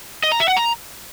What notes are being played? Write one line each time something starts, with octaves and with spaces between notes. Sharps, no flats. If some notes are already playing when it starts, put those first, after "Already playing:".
D#5
A#5
E5
F#5
A#5